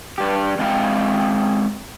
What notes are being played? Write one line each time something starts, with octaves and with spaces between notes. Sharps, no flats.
G2 G4
G#3 C4 E4 F5 G5